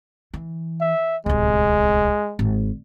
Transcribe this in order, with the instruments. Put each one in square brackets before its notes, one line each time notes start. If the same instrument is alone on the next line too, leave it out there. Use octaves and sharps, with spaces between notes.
[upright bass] E3
[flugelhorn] E5
[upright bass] D1 C2 [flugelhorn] G#3
[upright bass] G#1